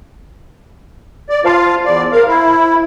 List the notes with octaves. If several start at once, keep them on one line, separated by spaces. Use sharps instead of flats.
D5
F4 C5 F5 A5 C6
E2 D5
A#4 F5
E4